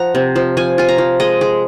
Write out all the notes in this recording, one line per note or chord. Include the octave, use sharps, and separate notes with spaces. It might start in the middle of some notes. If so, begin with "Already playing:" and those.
Already playing: F3 F#5 A#5
C3
F3
F3 G#5
F4 G#5
A#5
F3
G#3 D#5
G#3